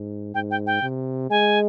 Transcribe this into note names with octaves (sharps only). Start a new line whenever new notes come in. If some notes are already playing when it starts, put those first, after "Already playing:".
Already playing: G#2
G#2 G5
G5
G5
C3
G#3 G#5